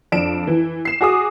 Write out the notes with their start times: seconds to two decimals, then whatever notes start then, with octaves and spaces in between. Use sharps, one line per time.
0.12 F2 D4 D7 E7
0.47 E3
0.85 C7 E7
1.01 F#4 G#4 D6 D#6